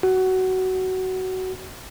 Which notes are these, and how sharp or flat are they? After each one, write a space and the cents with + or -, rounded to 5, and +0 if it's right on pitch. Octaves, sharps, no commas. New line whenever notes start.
F#4 +15